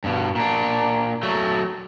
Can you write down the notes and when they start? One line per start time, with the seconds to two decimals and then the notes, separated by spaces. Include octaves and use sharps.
0.04 G2 B2
0.35 A#2 D4
1.23 F#3 A3